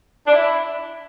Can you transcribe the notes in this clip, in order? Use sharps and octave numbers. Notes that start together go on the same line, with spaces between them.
D4
E4